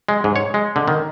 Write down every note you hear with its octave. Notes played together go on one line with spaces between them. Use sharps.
G#3
G#2
C#5
G#3
D3
D#3